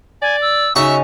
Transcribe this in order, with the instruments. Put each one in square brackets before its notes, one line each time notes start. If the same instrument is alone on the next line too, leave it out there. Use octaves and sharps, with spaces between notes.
[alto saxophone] D5 [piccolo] G#5
[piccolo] E6
[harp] C#3 D#4 [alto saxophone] C#4 [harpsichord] F#4 [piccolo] E5